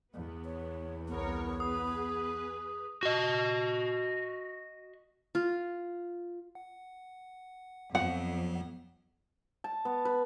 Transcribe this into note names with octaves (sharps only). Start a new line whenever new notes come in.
E2 B3
C#5
C2 B3 A#4 C#5
G#4 B4 D#6
F#4 D#5
F4
F#5
F2 F3 F#3 B3 F#5
A5
B3
B4